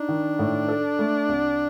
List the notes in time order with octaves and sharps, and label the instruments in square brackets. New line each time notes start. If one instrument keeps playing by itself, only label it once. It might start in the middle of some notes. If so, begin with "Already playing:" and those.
Already playing: [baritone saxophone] D4 [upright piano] D#4
[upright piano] D#3
A2
A4
A3
C2